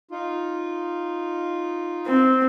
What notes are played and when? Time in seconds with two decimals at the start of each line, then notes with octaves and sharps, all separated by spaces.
0.11 D#4 F4
2.06 C4